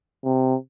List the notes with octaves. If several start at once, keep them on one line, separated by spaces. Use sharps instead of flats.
C3